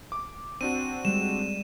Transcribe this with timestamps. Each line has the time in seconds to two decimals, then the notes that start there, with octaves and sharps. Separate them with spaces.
0.12 D6
0.61 C4 D4 F#4 D#7
1.05 G3 G#3 E7